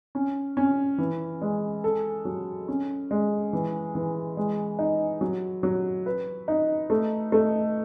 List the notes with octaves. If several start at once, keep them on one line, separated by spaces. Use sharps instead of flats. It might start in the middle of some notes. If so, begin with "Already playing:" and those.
C#4
C#4
E3
G#3
A4
F#3
C#4
G#3
E3
E3
G#3
D#4
F#3
F#3
B4
D#4
A3
A3